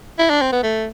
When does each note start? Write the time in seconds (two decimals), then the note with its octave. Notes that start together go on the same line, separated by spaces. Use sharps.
0.19 E4
0.30 D4
0.41 C4
0.52 B3
0.63 A3